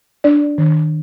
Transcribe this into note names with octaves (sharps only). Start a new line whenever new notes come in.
D4 D5
D#3